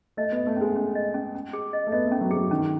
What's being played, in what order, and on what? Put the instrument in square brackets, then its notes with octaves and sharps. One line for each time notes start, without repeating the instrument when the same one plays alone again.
[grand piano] A3 [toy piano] D#5
[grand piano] B3
[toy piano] D#5
[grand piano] A3
[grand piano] G#3 [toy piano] C#4
[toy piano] C#4
D#5
C#4
C#4
G#4
D#5
[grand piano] A3
[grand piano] B3 [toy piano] D#5
[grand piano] A3
[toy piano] C#4
[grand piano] F#3
[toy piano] G#4
[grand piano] F#3
[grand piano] D#3 [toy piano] C#4